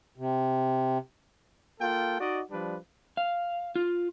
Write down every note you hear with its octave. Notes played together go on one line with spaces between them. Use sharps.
C3
A#3 F4 A4 G5
D#4 F#4 D5 D#5
F3 G3 D4 B4
F5
F4